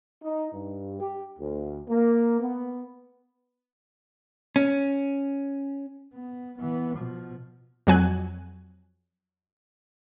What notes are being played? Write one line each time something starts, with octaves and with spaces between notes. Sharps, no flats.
D#4
G2
G4
D2
A#3
B3
C#4
B3
E3 B3
B2 F3
F2 F#3 G#5 F#6